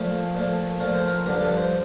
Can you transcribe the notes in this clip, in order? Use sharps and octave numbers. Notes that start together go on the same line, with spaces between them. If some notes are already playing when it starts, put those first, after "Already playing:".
Already playing: A#2 F3 A3
A#2 F3 A3
A#2 F3 A3 A#4
C5
A#4
G2 D3 F3 A#4
A4
C5